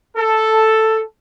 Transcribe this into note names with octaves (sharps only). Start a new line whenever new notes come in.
A4